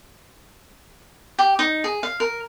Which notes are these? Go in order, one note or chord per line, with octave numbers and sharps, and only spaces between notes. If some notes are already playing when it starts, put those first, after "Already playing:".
G4
D#4
G#4
F5
A#4